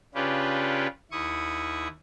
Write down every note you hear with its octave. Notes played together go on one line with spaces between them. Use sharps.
C#3 C#4 D4 F4 G4 B4
D#2 E4 C#6 D#6